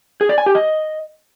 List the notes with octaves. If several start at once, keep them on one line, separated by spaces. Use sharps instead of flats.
G#4
D5
G#5
G4
D#5